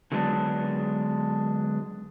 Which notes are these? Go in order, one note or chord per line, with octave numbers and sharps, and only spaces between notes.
D3 F#3 G#3 B3 D4